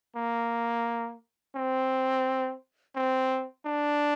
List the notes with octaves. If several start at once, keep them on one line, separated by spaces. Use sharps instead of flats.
A#3
C4
C4
D4